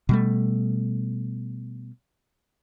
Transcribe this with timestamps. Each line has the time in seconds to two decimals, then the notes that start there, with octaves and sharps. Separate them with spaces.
0.09 B2 G3 A3